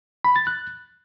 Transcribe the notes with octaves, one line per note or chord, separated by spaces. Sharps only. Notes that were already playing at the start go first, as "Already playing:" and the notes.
B5
A6
F#6